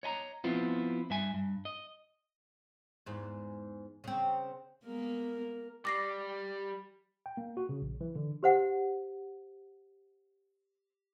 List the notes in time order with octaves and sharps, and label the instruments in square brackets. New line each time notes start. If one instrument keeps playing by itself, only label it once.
[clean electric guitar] C#5 D#5 G#5 A#5
F3 B3 C4 E4 F4
G2 E5 G#5
G2
D#5
[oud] E2 G#2
C#3 C4
[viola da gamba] G#3 A#3 B3 [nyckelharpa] A#4
[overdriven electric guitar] G3 [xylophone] D6 A#6 C7
[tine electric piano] G5
A#3
F#4
C#3
A#1
E3
D3
[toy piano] G4 C5 F#5